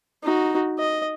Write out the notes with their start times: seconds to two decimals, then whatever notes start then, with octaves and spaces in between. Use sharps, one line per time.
0.23 D#4 F#4
0.79 D#5